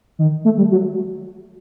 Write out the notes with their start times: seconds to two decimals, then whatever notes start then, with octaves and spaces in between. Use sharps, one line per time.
0.19 D#3
0.45 A3
0.58 G3
0.72 F#3